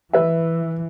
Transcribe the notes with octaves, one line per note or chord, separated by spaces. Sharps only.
E3 B4 E5